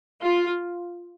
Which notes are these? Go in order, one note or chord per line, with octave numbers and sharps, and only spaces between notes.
F4